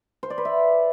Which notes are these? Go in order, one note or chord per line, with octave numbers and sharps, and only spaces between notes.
C5
D5
B4
E5